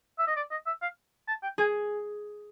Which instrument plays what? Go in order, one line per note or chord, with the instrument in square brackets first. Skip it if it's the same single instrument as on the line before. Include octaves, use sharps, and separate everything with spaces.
[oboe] E5
D#5
D5
D#5
E5
F5
A5
G5
[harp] G#4 [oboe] G#5